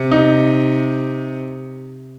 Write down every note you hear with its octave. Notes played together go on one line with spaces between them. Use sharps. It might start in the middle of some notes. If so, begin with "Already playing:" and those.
Already playing: C3
D#4